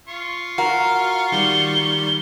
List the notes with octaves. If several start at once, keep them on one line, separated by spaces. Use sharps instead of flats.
F4 C#6
F#4 A#4 F5
D#3 G3 G7